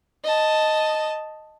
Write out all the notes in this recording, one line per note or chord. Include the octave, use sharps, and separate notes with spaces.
D#5 A5